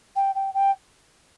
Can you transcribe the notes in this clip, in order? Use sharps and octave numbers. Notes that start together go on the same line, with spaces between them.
G5
G5
G5